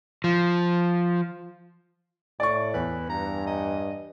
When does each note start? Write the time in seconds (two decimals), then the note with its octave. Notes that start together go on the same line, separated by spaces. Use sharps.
0.24 F3
2.40 A2 D5 C#6
2.74 E2 B4
3.09 G2 A#5
3.47 D#5